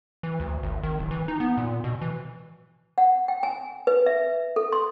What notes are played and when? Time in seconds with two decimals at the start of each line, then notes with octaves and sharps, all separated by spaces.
0.23 E3
0.40 D2
0.63 G#1
0.83 D#3
0.99 D1
1.11 E3
1.28 D#4
1.40 B3
1.57 A#2
1.84 B2
2.02 E3
2.98 F#5
3.28 G5
3.43 G#5
3.87 B4
4.06 E5
4.56 A4
4.72 C6